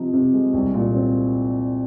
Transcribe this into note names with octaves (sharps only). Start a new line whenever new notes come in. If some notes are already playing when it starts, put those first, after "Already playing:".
Already playing: C3 F3 D#4
C3
G#3
C2
A#2
C4